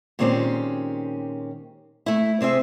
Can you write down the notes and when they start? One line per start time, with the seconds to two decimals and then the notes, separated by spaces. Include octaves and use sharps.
0.19 A#2 D#3 G#3 C4 C#4 G4
2.06 A3 E4
2.41 C3 C4 G#4 E5